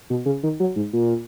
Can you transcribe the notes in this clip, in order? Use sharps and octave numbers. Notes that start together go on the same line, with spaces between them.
B2
C#3
D#3
F#3
G#2
A#2